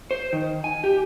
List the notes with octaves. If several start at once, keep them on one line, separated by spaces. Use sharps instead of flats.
C5
D#3
G#5
G4